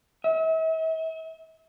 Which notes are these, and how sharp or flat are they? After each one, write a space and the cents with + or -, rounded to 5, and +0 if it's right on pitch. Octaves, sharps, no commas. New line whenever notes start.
E5 -40